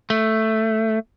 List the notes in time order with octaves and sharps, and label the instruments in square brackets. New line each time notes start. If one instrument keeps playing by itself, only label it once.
[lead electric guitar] A3